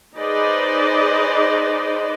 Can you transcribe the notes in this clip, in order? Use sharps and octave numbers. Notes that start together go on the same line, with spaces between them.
D#4 G#4 B4 C5 D5 D#5